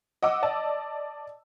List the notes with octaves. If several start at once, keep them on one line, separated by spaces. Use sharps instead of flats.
D#5 F#5 D6 E6
D5 D#5 A5